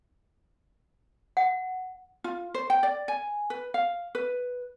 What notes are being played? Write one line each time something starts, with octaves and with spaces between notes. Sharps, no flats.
F#5
F4
C5
G5
D5
G#5
B4
F5
B4